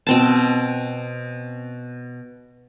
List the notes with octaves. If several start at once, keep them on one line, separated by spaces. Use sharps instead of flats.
B2 C4 A5